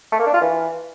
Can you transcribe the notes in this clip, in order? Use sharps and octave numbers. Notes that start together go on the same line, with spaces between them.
A3
A#3
D4
F4
E3